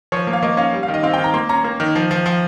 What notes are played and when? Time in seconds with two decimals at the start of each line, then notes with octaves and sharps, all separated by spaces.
0.12 F3 C#5
0.27 A#3
0.33 F5
0.43 A#3 D#5
0.57 C#4 F5
0.73 G3
0.83 F5
0.88 D#3
0.94 D#5
1.03 C4 F5
1.13 G5
1.18 D#3
1.24 A#5
1.34 A#3 C6
1.49 C#4 A#5
1.64 A#3
1.80 D#3
1.95 F3
2.11 F3
2.26 F3